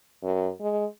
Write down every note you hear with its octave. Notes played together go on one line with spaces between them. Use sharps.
F#2
G#3